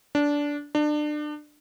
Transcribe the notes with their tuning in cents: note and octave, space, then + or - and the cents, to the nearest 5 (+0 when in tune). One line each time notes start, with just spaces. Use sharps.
D4 -15
D4 +30